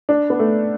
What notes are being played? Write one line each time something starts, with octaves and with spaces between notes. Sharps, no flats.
D4
B3
A3